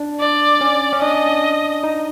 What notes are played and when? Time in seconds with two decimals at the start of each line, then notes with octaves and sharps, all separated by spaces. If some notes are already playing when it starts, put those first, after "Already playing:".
Already playing: D4
0.20 D5
0.61 C#4
0.93 C#4
1.02 D4 D#5
1.84 D#4